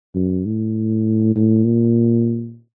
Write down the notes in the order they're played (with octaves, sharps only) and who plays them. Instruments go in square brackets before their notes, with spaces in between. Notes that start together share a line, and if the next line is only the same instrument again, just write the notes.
[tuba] F#2
A2
A2
A#2